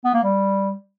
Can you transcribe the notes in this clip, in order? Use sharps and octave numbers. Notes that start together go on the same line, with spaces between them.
B3
A#3
G3